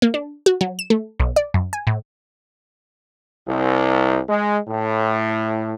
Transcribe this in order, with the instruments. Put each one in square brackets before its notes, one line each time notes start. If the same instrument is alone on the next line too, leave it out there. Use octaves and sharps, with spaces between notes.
[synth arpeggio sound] A#3
D4
F#4
F#3
E7
A3
B1
D5
F#2
G#5
A2
[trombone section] C2
G#3
A2